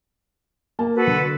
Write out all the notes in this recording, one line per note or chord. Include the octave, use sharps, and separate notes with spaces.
A#3 A5
F#4 A4 B4
D3